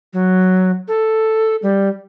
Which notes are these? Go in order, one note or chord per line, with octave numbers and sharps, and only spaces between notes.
F#3
A4
G3